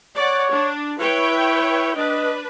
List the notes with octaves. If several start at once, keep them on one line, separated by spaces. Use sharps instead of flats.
C#5 D5 F#5
D4
E4 B4 C#5 G5
D4 B4 D#5